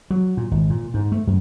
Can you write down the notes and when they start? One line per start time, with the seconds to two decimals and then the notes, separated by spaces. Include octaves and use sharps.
0.10 F#3
0.37 A#2
0.51 G#1
0.70 A#2
0.94 G#2
1.12 A3
1.27 F#2